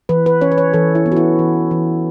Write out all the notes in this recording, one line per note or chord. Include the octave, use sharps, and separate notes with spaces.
E3 B4
B4
C#4 C#5
B4
C#5
E3 A4
E4
B3
F#4
E4
E3
E3